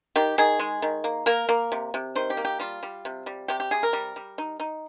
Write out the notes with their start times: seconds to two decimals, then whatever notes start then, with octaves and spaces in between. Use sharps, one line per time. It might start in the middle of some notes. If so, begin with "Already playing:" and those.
0.16 D#3 G4
0.38 D#3 G#4
0.59 G#3
0.82 D#3
1.04 A#3
1.26 A#3 A#4
1.49 A#3
1.72 C3
1.94 C3
2.16 D#3 C5
2.30 G4
2.37 A#3
2.45 G4
2.60 G3 F4
2.83 G3
3.05 C3
3.26 G3
3.48 C3 G4
3.60 G4
3.71 C3 G#4
3.83 A#4
3.93 G3
4.16 G3
4.38 D#4
4.60 D#4